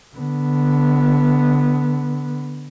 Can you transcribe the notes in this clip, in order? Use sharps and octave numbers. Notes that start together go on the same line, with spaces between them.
D3 B3